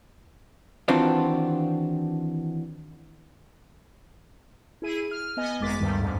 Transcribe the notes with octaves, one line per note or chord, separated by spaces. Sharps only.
D#3 E3 C4 D4 F4 F#4
E4 G#4 D#7
F6
B3 D#5 G#5
G#1 F#2 G#3 D6 A6 B6
D2 G2 D#3 G3
F2 G#2